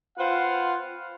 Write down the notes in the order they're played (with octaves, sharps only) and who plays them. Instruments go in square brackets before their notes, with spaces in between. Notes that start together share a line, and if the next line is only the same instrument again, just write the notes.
[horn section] C4 F4 B4 C5 F5 F#5